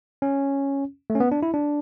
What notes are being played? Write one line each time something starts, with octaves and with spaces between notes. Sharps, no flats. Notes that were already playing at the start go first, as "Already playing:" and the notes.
C#4
A3
C#4
B3
D4
E4
D4